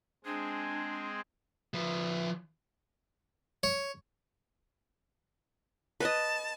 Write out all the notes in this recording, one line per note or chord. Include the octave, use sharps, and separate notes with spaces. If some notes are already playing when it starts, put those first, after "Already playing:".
G#3 C4 D4 G#4
F3 B4
C#5
B4 D#5 A5